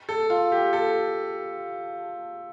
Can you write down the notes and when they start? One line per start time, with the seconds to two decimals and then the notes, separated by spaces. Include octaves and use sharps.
0.09 A4
0.30 F4
0.52 G4
0.73 A4